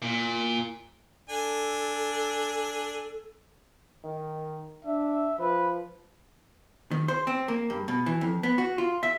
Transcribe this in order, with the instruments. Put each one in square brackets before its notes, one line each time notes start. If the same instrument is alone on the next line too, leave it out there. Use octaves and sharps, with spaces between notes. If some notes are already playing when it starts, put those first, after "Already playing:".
[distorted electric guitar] A#2
[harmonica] D4 G#5 [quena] A4
[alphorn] D#3
[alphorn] D4 [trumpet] E5
[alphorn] F3 [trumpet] B4
[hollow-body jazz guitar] D#3
C5
C4
A#3
G2
B2
E3
F2
B3
F#4
F4
E5